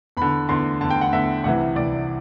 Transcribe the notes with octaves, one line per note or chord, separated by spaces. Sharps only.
E2 D3 B5
E2 D3 C6
E2 D3 A5
G5
F#5
E2 D3 E5
C2 C3 E3 F#5
C2 C3 E3 D5